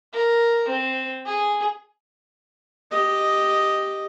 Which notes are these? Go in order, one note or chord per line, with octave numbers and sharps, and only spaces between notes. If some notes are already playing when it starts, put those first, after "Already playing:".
A#4
C4
G#4
G4 D#5